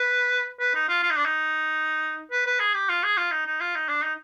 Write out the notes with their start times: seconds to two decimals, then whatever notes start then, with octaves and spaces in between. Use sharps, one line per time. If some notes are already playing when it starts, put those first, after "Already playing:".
Already playing: B4
0.60 B4
0.75 D#4
0.89 F4
1.03 F4
1.11 D#4
1.18 D4
1.25 D#4
2.31 B4
2.46 B4
2.60 G#4
2.74 G4
2.89 F4
3.03 G#4
3.17 F4
3.31 D#4
3.47 D#4
3.61 F4
3.75 D#4
3.89 D4
4.04 D#4